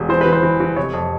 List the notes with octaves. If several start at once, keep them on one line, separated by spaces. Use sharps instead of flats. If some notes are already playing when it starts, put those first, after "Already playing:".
Already playing: E1
E3 C5
E3 B4
C5
E3
E3
F1 C#5
F2